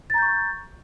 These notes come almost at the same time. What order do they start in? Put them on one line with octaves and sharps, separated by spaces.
A6 A#5 G6 C#6